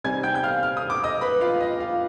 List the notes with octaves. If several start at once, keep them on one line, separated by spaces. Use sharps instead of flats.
C3 G3 C4 D#4 G#5 G#6
G5 G6
G6
F5 F6
F6
D#6
D6
D#5 D#6
B4 B5
F4 F5
D#5
F4 F5